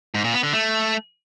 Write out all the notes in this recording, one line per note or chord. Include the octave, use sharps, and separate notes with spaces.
G#2
A#2
B3
D3
A3